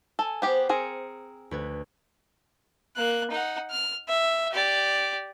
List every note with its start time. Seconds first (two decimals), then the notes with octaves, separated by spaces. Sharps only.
0.19 A4 G#5
0.42 B3 G4 C5 G5
0.69 C4 G#4 A#4 A#5 C#7
1.51 D2 B4 G#6
2.97 A#3 F#6
3.31 D#4 F#5
3.71 F6
4.08 E5
4.52 G4 D5